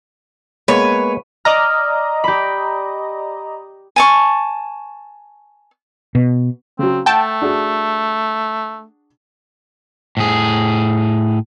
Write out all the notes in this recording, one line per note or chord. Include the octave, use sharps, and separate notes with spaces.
G#3 A#3 B3 B4 C#5
D5 D#5 A#5 F6
G4 B5
G#5 A5 C#6
B2
C#3 F#3 C4
A3 F#5 G5 A5
D4 F#4 G#4
A2 G#4